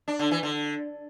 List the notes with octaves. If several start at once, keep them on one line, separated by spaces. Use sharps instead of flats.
D4
D3
E3
D3